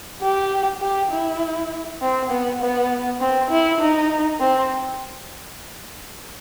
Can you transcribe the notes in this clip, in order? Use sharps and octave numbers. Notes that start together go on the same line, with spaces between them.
G4
G4
E4
C4
B3
B3
C4
E4
D#4
C4